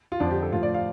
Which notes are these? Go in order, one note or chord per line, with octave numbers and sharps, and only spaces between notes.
F4
F2 D3 F3 D4
G4
A4
A2 F3 F4
D5
F5